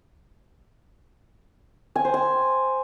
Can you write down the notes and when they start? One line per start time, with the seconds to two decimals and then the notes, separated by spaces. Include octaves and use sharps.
1.96 G#5
2.05 C5
2.14 G#5